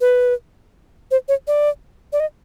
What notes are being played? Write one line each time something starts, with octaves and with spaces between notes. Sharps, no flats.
B4
C5
C#5
D5
D5
D#5